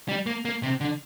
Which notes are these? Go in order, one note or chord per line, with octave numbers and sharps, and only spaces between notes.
G3
A#3
A#3
C3
D3